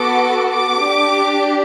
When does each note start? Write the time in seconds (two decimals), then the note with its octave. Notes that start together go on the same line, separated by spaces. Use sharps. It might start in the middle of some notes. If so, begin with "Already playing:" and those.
Already playing: B3 F#4 A4 D6
0.49 D6
0.84 D4 G4